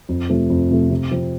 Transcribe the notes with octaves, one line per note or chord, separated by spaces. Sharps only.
F2
C3 F3 A3
F2
C3 F3 A3
C3
F3 C4